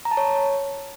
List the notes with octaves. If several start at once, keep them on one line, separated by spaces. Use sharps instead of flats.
A#5
A5
C#5